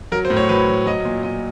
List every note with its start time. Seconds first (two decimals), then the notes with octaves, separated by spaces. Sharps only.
0.12 F#3 A#4
0.25 C5
0.30 A2
0.37 C#5
0.49 F#3 B4
0.68 F#3
0.86 F#3 D#5
1.05 A#2
1.23 A#2 D#5